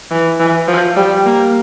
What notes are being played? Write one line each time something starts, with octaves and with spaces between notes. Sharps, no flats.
E3
E3
F3
G3
A#3